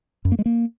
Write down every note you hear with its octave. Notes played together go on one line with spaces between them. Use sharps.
F#2
A#3
G#3
A#3